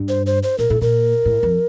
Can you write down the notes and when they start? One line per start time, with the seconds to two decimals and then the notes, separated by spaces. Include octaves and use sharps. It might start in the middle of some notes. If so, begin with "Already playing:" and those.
Already playing: G2
0.09 C5
0.26 C5
0.43 C5
0.58 A#2 A#4
0.70 A2 A4
0.81 A#2 A#4
1.25 A2
1.43 F2